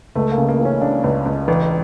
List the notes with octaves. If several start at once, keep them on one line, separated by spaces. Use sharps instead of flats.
C#2 A3
A#3
C#3
A#3
E3
C#4
C#3 D4
C#2
C#2
A1